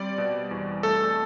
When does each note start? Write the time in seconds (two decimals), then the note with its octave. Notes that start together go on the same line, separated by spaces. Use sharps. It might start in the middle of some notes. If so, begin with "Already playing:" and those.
Already playing: G3 C4 D5
0.18 B2
0.51 E2
0.83 A3 A4